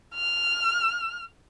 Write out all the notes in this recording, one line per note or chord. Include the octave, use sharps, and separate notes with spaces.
F6